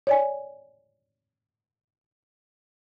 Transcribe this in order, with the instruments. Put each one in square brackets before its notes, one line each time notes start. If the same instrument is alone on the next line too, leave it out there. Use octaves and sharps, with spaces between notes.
[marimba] C#5 D5 G#5